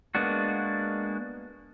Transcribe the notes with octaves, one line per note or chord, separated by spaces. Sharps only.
G#3 A#3 B3 D4 F#4